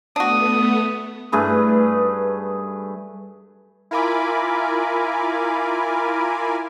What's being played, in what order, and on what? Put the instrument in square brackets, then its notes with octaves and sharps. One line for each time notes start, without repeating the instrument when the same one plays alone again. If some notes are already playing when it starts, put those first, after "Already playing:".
[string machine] A3 B3 [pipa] D4 F#4 [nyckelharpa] D#6
[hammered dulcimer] G2 A3 G#4 B4
[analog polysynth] E4 F4 A#4 G#5 B5 D6